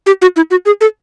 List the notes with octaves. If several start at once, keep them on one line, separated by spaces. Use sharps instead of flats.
G4
F#4
E4
F#4
G#4
A4